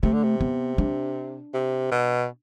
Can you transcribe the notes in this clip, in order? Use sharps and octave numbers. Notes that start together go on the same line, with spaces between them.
C3 A3
D3
C3
B3
D4
C3
B2